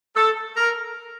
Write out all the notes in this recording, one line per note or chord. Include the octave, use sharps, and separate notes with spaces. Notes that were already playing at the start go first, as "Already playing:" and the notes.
A4
A#4